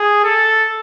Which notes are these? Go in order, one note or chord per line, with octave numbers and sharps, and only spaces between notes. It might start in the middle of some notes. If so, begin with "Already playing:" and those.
Already playing: G#4
A4